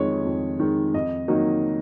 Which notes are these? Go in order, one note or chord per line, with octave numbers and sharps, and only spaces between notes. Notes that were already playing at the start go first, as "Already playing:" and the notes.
Already playing: F2 D#3 G#3 C#5
F2
D#3 G#3
F2 D#5
D#3 F#3 A#3 D#4